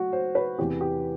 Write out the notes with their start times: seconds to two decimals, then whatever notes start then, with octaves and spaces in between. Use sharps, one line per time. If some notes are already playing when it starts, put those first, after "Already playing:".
Already playing: F#3 A3 F#4
0.13 C5
0.35 B4
0.58 E2 C3 E3 B3 G4
0.81 G4